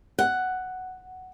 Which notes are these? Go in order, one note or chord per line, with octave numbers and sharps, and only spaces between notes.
F#5